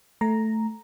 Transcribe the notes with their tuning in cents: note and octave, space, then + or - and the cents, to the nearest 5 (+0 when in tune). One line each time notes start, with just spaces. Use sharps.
A3 +0 A#5 +0